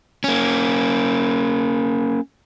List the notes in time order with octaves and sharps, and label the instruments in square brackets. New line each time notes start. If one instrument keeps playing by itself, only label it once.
[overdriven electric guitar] A#3 C#4